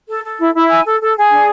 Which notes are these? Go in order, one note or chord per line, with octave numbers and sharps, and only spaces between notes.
A4
A4
E4
E4
G#5
A4
A4
G#4
D4